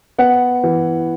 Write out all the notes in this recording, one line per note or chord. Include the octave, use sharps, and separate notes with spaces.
B3 F#5
E3